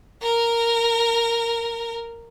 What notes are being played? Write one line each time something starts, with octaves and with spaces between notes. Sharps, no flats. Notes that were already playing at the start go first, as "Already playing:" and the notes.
A#4